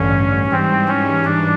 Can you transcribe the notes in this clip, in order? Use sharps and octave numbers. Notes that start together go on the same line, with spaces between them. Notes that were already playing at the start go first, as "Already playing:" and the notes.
Already playing: A1 G2 D3 C#4
G#2 E3 G3 C4
C#4
D4